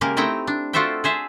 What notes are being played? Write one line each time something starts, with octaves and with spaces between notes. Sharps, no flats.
C#3 G#3 A#3 G4 A#4
A3 C4 D#4 E4 G5 A#5
D4
F4 F#4 A4 C5 E5 G5
G#4 C5 E5 A5